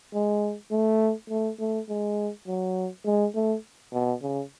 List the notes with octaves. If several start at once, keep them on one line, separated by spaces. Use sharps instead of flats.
G#3
A3
A3
A3
G#3
F#3
G#3
A3
B2
C#3